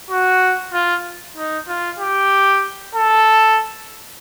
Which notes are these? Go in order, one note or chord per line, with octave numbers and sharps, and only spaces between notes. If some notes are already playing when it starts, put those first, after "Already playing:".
F#4
F4
D#4
F4
G4
A4